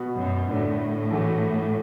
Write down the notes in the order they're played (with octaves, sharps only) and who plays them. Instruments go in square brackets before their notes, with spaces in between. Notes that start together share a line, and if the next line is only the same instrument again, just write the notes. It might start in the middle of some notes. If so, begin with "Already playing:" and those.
Already playing: [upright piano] B2 B3 F#4
[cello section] F#2
[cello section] A2 [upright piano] D3 A3 D4
[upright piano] E2 E3 A3 F#4